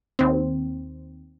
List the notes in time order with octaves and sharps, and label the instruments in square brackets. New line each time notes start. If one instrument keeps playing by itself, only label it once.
[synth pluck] D#2 C4